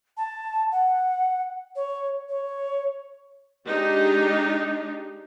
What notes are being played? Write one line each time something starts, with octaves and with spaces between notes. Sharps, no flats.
A5
F#5
C#5
C#5
G#3 D4 D#4 G4